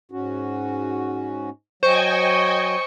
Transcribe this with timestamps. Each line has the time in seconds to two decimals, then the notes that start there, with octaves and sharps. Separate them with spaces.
0.11 G#2 C#4 F#4
1.83 F#3 C5 D#5 G5 G#5 C#6